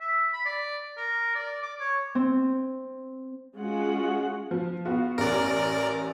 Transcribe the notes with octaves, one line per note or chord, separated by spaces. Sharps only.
E5
B5
D5
A#4
D5
D6
C#5
C4
G#3 C#4 F4 F#4 F#5
F3
B3 F4 F#4
A1 A#4 D5